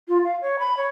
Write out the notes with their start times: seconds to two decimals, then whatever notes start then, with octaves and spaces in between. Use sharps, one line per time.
0.08 F4
0.24 F5
0.42 C#5
0.59 B5
0.77 C#5